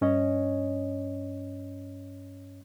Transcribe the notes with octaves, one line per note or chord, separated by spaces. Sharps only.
G2 C#4 C#5 D#5